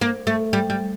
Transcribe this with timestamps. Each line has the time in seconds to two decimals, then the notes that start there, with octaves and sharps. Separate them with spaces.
0.01 A#3
0.27 A3
0.53 G3
0.70 G3